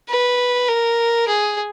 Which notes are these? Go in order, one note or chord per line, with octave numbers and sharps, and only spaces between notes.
B4
A#4
G#4